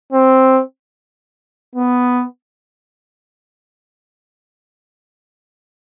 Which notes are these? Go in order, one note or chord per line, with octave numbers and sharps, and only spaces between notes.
C4
B3